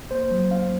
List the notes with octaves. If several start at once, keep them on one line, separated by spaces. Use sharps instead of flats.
A#3 C5
F#3
C#4 F5